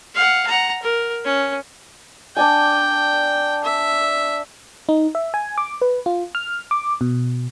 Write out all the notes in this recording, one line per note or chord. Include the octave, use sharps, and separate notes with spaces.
F5 F#5
F#5 A#5
A#4
C#4
D4 D5 G5 G#5
E5
D#4
E5
G#5
D6
B4
F4
F6
D6
B2